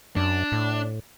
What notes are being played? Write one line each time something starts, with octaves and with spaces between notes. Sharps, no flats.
F#2 D4
A2